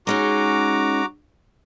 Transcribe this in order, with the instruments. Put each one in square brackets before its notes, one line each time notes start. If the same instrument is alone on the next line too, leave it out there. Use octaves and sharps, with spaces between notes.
[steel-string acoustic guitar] G#3 C#4 D#4 [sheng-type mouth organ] F#4 A#5 D6